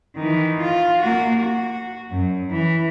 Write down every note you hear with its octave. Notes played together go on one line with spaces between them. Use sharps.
D#3 E3
F4
A#3 F#4
F#4
F#2
E3